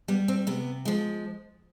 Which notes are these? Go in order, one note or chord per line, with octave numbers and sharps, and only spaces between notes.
G3 B3
C4
C3 B3
F3 G#3